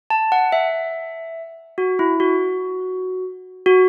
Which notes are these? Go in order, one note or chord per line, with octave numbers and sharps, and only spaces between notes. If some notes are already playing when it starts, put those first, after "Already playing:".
A5
F#5
E5
F#4
E4
F#4
F#4